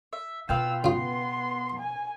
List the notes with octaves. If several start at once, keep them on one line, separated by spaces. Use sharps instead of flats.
E5
B2 F4 B4 F5 G5 E6
C#3 B3 F4 C6
G#5